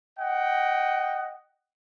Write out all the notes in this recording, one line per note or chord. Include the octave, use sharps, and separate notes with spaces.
D#5 F#5 G5